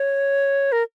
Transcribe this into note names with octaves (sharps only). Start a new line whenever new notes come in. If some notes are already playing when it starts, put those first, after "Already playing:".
Already playing: C#5
A#4